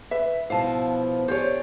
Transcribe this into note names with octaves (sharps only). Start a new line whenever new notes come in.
B4 E5
B2 F3 B3 E4 F5 A5
D4 G4 G#4 C5 C#5